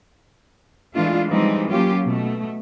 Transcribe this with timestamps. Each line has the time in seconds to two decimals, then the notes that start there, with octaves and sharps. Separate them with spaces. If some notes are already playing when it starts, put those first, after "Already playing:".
0.95 E3 G#3 A3 D4 F4
1.30 E3 F3 G3 G#3 C4 D#4
1.70 F#3 A#3 C#4 F4 G4
2.04 B2 A3